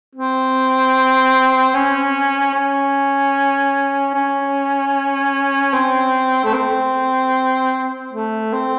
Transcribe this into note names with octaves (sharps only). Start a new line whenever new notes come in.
C4
C#4
C#4
C#4
C4
A3
C4
A3
C4